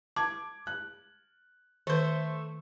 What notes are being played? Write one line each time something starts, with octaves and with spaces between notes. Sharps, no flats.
A5 D6 G#6
F#6
D#3 A3 B4 C5